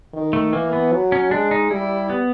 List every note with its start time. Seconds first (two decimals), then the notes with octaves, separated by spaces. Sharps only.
0.14 D#3
0.33 A3
0.53 E3 A#3
0.73 B3
0.92 F#3
1.12 C#4
1.31 G#3 D4
1.51 D#4
1.71 G3 E4
2.10 B3